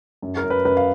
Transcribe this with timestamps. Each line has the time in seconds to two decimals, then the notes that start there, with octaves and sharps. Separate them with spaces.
0.22 F#2
0.37 A#4
0.44 F#2
0.50 B4
0.65 F#2 B4
0.77 F5